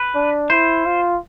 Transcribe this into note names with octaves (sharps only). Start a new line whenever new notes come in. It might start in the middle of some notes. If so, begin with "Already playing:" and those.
Already playing: B4
D4
E4 C5
F4